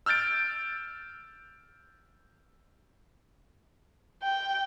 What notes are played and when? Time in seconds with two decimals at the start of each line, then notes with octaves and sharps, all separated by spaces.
0.06 E6 F6 G6 A6 D7
4.23 G5